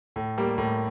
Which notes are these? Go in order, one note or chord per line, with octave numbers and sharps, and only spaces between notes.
A2
G3 A#3
A2